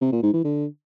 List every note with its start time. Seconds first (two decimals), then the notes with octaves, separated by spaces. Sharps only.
0.02 C3
0.12 A#2
0.23 G#2
0.34 E3
0.44 D3